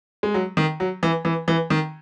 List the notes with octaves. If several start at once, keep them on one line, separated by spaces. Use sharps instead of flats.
G#3
F#3
D#3
F#3
E3
E3
E3
D#3